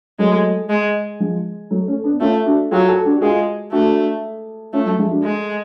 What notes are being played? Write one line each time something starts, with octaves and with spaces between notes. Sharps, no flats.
F#3 G#3 A3
G#3
F3 G#3
F#3 A3
A3 C#4
B3 D4
A3 C#4 F4
D4 F#4
F#3 F4 G#4
F#4 A4
D4 F#4
F#4
G#3 F4 G#4
A3 D4 F#4
A3 C#4 F4
F#3
F3 G#3
D4 F#4
G#3